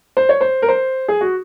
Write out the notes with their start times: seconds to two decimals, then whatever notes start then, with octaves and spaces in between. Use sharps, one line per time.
0.17 C5
0.29 C#5
0.41 C5
0.62 A#4
0.68 C5
1.08 G#4
1.21 F#4